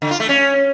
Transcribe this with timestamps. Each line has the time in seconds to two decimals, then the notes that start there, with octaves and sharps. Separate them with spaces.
0.02 D3
0.11 F4
0.20 A3
0.29 C#4